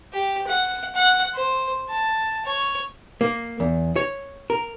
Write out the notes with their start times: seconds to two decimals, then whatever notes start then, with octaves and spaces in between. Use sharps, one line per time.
0.13 G4
0.47 F#5
0.95 F#5
1.34 C5
1.89 A5
2.45 C#5
3.21 A#3
3.60 E2
3.96 C#5
4.50 A#4